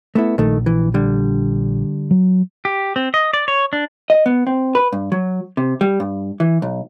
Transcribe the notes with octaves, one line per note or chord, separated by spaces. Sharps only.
A3 B3 E4
A#1 D#3 A3
E3
D3 G3
F#3
G4
C4
D#5
D5
C#5
D4
D#5
B3
C4
B4
G2
F#3
C3
G3
G2
E3
B1